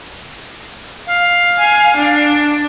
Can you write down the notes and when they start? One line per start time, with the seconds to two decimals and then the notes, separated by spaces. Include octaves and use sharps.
1.07 F5
1.59 G#5
1.96 D4